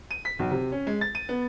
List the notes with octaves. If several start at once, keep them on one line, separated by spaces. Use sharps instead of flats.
D#7
B6
B1
C3
C#4
G#3
A6
D#7
B3